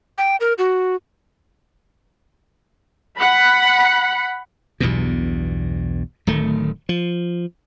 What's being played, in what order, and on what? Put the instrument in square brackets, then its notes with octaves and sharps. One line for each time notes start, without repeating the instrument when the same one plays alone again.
[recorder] G5
A#4
F#4
[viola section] F#5 B5
[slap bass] B1 E2 G2 B2
D1 D#3 A3
F3